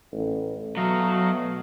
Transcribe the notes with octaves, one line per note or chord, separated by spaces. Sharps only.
A1
B2 F#3 A3 D#5 F5